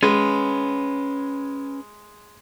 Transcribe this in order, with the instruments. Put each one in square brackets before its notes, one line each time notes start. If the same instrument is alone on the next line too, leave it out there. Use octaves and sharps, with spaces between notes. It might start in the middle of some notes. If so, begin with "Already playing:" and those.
[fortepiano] G#3 [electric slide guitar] C#4 B4